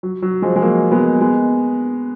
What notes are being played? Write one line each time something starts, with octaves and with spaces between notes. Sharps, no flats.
F#3
F#3
F3 G#3
G#3
F#3 A#3
G#3 B3
G#3 B3